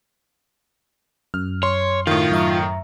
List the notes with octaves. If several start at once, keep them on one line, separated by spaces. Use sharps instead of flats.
F#2 F6
C#5 C6
A2 D#3 F4
F#2 E5 A#5